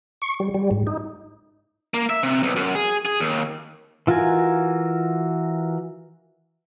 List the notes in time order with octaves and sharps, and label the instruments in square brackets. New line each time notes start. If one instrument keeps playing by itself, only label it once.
[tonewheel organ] C#6
G3
G3
G#2
D#4
[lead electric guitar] A#3
E5
C3
B1
F#2
G#4
G#4
D#2
[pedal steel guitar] E3 F4 F#4 A#4 G#5